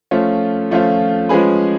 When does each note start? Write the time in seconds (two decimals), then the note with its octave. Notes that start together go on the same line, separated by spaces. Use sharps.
0.11 F3 A3 C#4 F4
0.71 F3 A3 C#4 F4
1.29 F3 G#3 C#4 G#4 B4